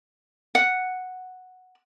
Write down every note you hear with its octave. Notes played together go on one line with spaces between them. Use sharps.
F#5